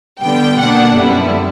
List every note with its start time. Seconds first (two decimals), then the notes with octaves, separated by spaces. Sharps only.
0.22 D3 G3 B3 G5
0.59 B2 A#3 D4 F#5
0.94 F#2 D3 G3 B3 E4